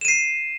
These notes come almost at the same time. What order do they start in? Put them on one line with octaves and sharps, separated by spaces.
E7 D#7 C7